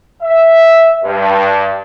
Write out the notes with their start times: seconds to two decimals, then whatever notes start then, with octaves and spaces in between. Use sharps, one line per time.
0.22 E5
1.03 G2